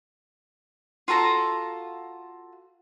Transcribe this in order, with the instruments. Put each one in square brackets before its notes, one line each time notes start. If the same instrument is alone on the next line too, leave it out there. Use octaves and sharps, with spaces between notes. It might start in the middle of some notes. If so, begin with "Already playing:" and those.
[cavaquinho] F4 F#4 A4 A#5